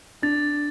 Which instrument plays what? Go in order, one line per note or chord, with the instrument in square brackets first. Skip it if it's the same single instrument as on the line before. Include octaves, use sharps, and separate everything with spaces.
[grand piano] D4 [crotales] A6